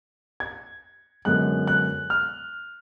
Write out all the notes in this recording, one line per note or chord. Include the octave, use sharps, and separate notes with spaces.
G#6
F#2 D3 G#3 B3 F#6
F#6
F6